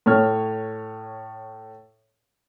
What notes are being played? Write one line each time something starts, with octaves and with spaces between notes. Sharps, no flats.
A2 C#5 F6